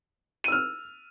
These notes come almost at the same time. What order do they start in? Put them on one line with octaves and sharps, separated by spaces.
D#7 E6 F6